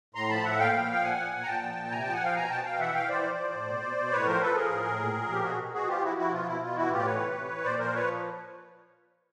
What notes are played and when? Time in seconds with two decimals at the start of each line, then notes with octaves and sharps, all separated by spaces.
0.15 A2 A#5 C6
0.29 F3 A5 B5
0.44 A2 E5 F#5
0.59 A#2 F5 G5
0.74 F3
0.88 F3 G5
1.03 A#2 F#5 G#5
1.18 F3
1.33 A#2
1.43 A#5
1.47 A#2 G5 A5
1.62 F3
1.76 A#2
1.91 C3 G#5 A#5
2.02 F3 G5 A5
2.13 F#5 G#5
2.21 F3 F5 G5
2.35 B2 G#5 A#5
2.50 B2 G5 A5
2.65 B2 F5 G5
2.79 E3 E5 F#5
2.93 E3 F5 G5
3.09 E3 C5 D5
3.23 F3
3.38 F3
3.53 A2
3.68 B2
3.82 B2
3.97 B2
4.12 A2 B4 C#5
4.26 F3 A#4 C5
4.41 F3 A4 B4
4.55 F3 G#4 A#4
4.70 A2
4.85 A2
5.00 A#2
5.14 A#2
5.29 F3 G4
5.44 B2 F#4 G#4
5.58 B2
5.73 B2 F#4 G#4
5.88 F3 F4 G4
6.02 F3 E4 F#4
6.17 F3 E4 F#4
6.32 B2 F4
6.46 B2 E4
6.61 B2 F4
6.76 E3 E4 F#4
6.90 A2 F4 G4
6.99 D5
7.05 E3 B4 C#5
7.20 C3
7.35 C3
7.49 E3
7.64 A#2 C5 D5
7.79 F3 A#4 C5
7.93 F3 B4 C#5